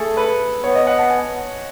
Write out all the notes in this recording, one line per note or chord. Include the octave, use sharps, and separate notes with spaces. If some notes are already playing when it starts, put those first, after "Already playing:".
Already playing: A3 G#4 A4
B4
B3 C#5
D#5
F#5
A5
G#5